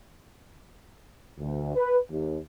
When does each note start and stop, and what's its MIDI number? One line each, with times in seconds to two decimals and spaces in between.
1.38 1.75 38
1.75 1.97 71
2.10 2.37 39